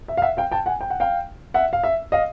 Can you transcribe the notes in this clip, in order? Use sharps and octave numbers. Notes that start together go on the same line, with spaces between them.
E5
F5
E5 F#5
F5 G5
G5 A5
F#5 G#5
G5
F#5
F5 G5
E5 F#5
F5
E5
D#5 F5